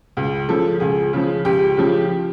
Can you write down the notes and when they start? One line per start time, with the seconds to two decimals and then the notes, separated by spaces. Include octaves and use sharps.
0.17 C#2
0.48 C#3 F3 A4
0.80 C#2 G#4
1.13 C#3 F3
1.45 C#2 G4
1.77 C#3 F3